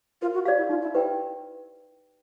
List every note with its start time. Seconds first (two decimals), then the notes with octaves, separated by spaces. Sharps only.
0.22 F4 A#4
0.34 F#4
0.45 G4 D5 F5
0.57 E4
0.69 D#4 F4
0.82 E4
0.94 E4 G4 B4 D5 G5